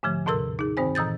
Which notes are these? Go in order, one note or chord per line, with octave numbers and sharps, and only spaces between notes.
G#2 D3 F3 A3
D#2 A2 C3 A4 A#4 E6
D#4 G#4
G2 D#3 C4 C5 G#5
A#2 E3 D#6 G6 A6